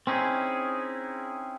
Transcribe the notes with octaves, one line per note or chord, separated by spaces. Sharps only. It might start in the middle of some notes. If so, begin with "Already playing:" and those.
C4 C#4 D#4 E4 G#4